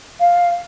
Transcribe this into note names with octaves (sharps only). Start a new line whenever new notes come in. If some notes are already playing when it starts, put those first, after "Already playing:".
F5